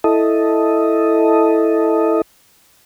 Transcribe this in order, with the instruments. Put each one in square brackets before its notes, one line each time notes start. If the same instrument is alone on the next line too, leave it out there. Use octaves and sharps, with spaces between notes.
[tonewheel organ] E4 A4 D#5